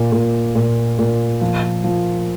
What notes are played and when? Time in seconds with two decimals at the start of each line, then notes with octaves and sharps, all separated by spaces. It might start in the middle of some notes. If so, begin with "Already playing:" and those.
Already playing: A#2
0.12 A#2
0.55 A#2
0.99 A#2
1.41 F3
1.84 F3